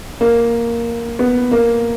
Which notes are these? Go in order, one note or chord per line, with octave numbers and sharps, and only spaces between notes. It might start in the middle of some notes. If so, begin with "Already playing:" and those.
A#3
B3
A#3